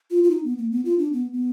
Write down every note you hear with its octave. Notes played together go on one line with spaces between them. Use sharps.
F4
F4
D#4
B3
A#3
B3
F4
D4
B3
B3